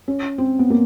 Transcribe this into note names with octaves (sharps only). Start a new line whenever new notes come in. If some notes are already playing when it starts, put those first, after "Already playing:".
C#4
C4
B3
A#3